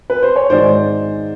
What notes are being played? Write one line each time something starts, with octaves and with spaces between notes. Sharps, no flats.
B4
C5
C#5
G#2 D#3 G#3 C5 D5